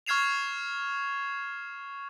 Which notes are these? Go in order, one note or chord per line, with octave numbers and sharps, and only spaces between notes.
C#6 F6 G#6 C7 E7 F7